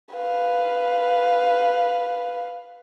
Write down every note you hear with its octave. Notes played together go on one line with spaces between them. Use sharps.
B4 F5